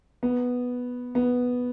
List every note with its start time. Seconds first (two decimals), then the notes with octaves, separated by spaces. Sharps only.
0.23 B3
1.15 B3